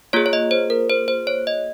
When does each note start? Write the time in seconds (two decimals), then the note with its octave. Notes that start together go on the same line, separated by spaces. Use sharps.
0.13 A#3 F4 G#4 C#5
0.26 C#5
0.33 D#5
0.51 C5
0.70 A#4
0.90 C5
1.08 C5
1.27 C#5
1.47 D#5